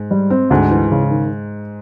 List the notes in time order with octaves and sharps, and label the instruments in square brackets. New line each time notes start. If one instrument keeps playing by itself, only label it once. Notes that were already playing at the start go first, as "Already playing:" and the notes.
Already playing: [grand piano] G#2
[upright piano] G3
C4
[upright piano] D2 [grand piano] G#2
[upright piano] E3
C#3
D#3